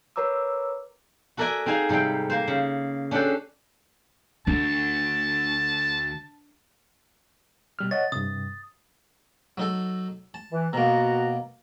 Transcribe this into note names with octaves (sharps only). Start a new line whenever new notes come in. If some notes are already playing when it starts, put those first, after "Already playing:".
A#4 B4 C#5 A#5 D6 E6
F#4 A4 A#4 D5 E5 G#5
C4 D#4 G#4 F5 G#5
G#2 C3 G3 A4 G5
A#3 C5
C#3
C#4 D4 F#4 G4 A4 C5
D2 D4 A5
B2 G3 F6
C#5 D#5 F#5 A6
G2 C3 D#6
F#3 D#4 A4
A5
E3
B2 A#3 B3 F#4 A#5